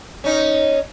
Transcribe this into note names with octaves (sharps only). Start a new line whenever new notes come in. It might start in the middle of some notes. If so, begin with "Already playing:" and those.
C#4 D#4